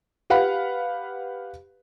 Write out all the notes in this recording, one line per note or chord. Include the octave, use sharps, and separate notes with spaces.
G4 B4 F5 F#5 B5